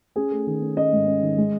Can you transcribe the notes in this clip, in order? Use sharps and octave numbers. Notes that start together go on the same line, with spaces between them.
C#4 G#4
A3
D#3
C#4
C#4 D#5
G#2
C#4
D#3
G#3